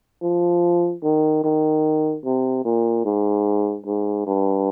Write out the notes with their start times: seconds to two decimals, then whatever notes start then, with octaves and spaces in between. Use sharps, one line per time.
0.22 F3
1.03 D#3
1.44 D#3
2.25 C3
2.65 A#2
3.05 G#2
3.86 G#2
4.26 G2